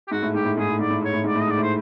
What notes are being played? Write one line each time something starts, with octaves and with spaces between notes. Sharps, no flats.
G4
G#2 F#4
A2
G#2 G4
A2
G#2 G#4
A2
G#2 D5
A2
G#2 C#5
A2
G#2 D5
A2
D#5
G#2 D5
A2
C5